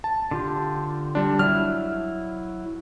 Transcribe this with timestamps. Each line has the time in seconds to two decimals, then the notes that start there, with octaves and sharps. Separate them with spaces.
0.04 A5
0.31 D3 F4 G4
1.15 G3 D4
1.39 F#3 E4 F6